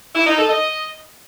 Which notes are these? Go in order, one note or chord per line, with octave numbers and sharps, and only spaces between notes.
E4
D#4
A4
D#5